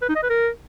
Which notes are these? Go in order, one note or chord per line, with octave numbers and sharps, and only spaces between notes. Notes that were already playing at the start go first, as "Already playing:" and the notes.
B4
D#4
D#5
B4
A#4